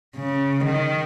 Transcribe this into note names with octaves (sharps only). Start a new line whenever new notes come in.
C#3
D#3